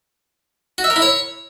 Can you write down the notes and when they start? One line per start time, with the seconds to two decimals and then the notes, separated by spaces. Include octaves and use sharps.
0.78 F#4
0.84 E5
0.90 A#4
0.96 E4
1.02 C#5